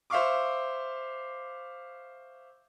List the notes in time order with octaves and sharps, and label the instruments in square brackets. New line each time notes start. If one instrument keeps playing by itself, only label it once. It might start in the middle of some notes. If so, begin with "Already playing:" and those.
[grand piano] C5 E5 F5 C#6 D6